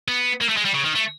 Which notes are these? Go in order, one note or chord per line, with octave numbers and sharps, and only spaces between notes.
B3
A#3
A3
G#3
G3
C#3
D#3
A3